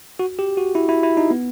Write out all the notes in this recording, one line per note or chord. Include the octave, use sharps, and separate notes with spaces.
F#4
G4
F#4
E4
E4
E4
D#4
B3